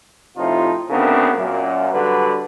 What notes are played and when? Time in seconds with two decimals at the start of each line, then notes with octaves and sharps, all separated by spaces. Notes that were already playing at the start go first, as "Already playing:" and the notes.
0.37 A2 C3 F3 D#4 F4
0.90 D2 C#3 B3 C4 D4 A#4
1.36 F#2 A#2
1.92 D3 F#3 G3 B4